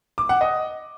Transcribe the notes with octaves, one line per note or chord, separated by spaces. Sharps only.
D6
F#5
D#5